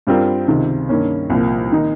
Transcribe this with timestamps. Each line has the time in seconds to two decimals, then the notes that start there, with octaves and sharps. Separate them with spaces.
0.07 G2 G3 C4 F4 A#4
0.48 C#2 C3 D#3
0.89 G2 D#3 A#3 C#4
1.30 C2 A#2 F3 A#3
1.72 D#3 A#3 D#4